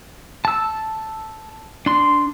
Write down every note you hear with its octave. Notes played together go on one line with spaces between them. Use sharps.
A5 E6
D4 C6